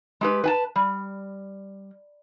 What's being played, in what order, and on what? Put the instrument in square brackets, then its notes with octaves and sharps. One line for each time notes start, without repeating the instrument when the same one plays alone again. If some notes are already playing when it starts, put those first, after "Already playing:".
[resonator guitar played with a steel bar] G#3 G4 B4
B4 G#5 A5
G3